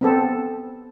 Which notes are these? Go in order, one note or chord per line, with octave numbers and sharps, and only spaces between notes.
B3 C4 A4